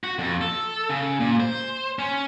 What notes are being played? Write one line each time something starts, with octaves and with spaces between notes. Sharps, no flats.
F#4
F2
A4
C#3
A#2
C5
C#4